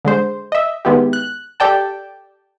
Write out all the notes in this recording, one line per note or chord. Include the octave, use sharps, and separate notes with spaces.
D3 G#3 C5
D#5 E5
D#3 G#3 B3 E4 G4
F#6
G4 A4 D5 G5 A5